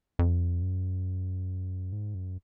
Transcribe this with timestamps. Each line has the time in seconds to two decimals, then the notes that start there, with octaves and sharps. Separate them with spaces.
0.19 F2
0.62 F#2
1.92 G#2
2.15 F#2